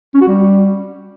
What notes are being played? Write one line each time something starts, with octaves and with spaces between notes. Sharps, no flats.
C#4
F#4
G3